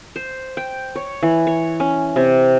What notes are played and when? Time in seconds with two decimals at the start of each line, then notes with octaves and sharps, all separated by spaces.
0.16 C5
0.57 G5
0.95 C#5
1.23 E3
1.47 C#5
1.80 C#4
2.16 C3